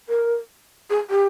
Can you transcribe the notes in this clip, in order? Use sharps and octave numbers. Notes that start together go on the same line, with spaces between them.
A#4
G#4
G4